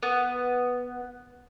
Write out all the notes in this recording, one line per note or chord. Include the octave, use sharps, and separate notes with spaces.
B3